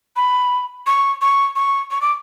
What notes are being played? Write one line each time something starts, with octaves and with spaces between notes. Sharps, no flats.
B5
C#6
C#6
C#6
C#6
D6